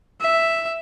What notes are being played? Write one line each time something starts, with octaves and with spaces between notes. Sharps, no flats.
E5